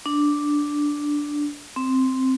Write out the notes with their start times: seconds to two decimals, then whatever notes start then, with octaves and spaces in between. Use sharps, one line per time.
0.06 D4
1.76 C4